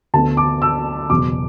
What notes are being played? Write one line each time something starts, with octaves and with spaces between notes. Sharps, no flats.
D2 D3 B3 A5
D6
E6
F#1 E2 B2 D6